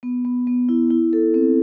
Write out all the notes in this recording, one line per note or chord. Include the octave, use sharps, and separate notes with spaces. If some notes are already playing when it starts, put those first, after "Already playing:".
B3
B3
B3
E4
E4
A4
C4